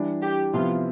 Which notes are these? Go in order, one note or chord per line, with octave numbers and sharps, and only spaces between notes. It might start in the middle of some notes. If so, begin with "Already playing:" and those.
Already playing: E3 G3 D4
G4
C3 F3 B3 E4 F4